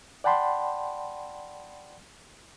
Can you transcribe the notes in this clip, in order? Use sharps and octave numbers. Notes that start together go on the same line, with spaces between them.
D5 F#5 G5 A5 B5 C6